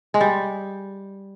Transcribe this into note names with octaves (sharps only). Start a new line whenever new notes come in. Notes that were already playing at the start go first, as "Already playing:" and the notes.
G#3
G3